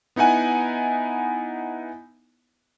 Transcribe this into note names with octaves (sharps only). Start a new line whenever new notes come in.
B3 D#4 E4 F#5 G#5